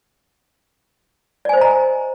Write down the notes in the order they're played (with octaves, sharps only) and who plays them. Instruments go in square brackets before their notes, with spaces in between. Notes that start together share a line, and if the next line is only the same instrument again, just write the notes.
[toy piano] D5
G#5
C5
D#5
A#5